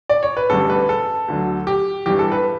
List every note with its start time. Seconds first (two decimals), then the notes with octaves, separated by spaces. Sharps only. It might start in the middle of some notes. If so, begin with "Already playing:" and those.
0.10 D5
0.23 C#5
0.37 B4
0.50 A1 G2 D3 G3 A4
0.70 B4
0.89 A4
1.28 D2 D3 F#3
1.67 G4
2.06 G1 G2 E3 G4
2.19 A4
2.32 B4